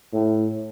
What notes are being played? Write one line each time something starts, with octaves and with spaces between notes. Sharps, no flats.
A2